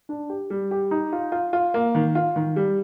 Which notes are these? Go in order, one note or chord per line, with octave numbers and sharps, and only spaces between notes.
D4
G4
G3
G4
D#4
F4
F4
F4
A#3
D#3
F4
D#3
G3